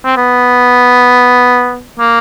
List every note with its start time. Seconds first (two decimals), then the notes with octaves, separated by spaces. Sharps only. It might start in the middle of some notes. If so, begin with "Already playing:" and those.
0.05 C4
0.17 B3
2.00 A#3